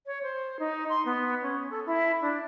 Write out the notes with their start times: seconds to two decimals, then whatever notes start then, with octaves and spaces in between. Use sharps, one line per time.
0.06 C#5
0.23 C5
0.59 D#4
0.89 C6
1.06 B3
1.42 C#4
1.71 A4
1.86 E4
2.22 D4